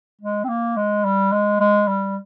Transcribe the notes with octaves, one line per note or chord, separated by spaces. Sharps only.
G#3
C4
A#3
G#3
G3
G#3
G#3
G3